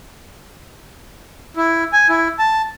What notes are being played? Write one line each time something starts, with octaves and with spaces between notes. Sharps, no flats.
E4
G#5
E4
A5